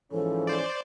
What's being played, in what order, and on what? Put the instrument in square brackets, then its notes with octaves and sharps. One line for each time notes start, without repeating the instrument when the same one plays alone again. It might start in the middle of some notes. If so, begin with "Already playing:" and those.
[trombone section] G#2 F3 C#4 [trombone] E3 [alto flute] A4
[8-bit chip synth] C5 D5